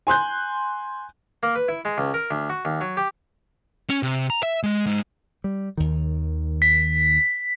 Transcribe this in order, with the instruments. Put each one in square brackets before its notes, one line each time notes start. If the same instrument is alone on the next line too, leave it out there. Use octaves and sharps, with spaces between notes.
[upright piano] G#5 C6 F#6 G6
[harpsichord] A#3
B4
E4
G#3
C#2
A#4
D2
F#4
D#2
F#3
G4
[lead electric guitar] C#4
C3
A#5
E5
G#3
G#2
[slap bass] G3
D#2 D#3
[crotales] B6